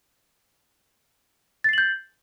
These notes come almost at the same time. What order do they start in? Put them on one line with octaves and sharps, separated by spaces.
A6 C7 F#7 G6